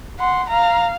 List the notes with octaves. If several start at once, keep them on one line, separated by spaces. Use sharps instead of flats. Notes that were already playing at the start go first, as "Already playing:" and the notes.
F#5 C6
F5 A#5